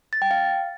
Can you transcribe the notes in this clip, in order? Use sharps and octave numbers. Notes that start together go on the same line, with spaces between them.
A6
G5
F5